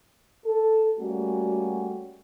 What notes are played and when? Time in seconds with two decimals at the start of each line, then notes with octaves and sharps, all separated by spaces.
0.44 A4
0.97 G3 A3 A#3 C#4 F#4